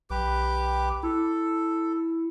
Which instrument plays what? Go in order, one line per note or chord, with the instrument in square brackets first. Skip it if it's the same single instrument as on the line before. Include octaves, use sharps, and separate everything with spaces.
[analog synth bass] B1 [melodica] G4 B4 D6
[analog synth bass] E4 [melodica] A4